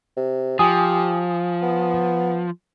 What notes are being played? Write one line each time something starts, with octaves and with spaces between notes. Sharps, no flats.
C3
F3 G4 G#5 D#6
B3